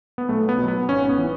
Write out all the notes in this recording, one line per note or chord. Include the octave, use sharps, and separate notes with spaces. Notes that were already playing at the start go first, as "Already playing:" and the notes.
B3
B1 A3
B3
B2 F#3
B3
G#1 C#4
B3
E3